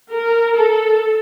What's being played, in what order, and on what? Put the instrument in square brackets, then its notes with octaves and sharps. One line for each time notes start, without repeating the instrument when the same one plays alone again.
[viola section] A#4
A4